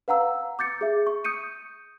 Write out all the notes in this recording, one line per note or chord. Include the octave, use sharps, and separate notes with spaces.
B4 F5 F#5 A#5 E6
D6 G6 A6 C#7
G#4 E5
C#6
D#6 G6 C#7 D#7